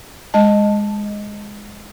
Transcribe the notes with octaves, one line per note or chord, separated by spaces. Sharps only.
G#3 D#5 A5